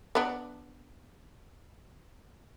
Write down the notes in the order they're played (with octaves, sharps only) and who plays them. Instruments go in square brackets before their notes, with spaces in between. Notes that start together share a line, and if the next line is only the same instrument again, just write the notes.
[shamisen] B3 D4